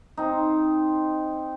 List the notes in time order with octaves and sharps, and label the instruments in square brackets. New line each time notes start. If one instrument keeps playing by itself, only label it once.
[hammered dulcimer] C4 D#4